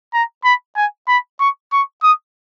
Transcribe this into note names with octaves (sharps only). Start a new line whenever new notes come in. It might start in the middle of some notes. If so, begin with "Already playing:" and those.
A#5
B5
G#5
B5
C#6
C#6
D#6